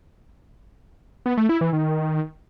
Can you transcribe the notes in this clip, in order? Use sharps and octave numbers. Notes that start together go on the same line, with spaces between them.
B3
A3
E4
E3
D#3